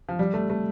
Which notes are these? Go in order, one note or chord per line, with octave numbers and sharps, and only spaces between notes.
F3
G3
A3
A3